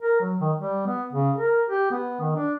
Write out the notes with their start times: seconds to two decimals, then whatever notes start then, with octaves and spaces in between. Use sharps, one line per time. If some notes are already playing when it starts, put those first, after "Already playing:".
0.01 A#4
0.21 F#3
0.40 D#3
0.59 G3
0.87 B3
1.13 C#3
1.36 A#4
1.70 G4
1.91 B3
2.21 D#3
2.36 D4